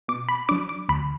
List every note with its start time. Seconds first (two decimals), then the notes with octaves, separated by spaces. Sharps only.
0.08 B2 D6
0.29 B5
0.49 F#3 D4 D6
0.69 D6
0.89 D2 B5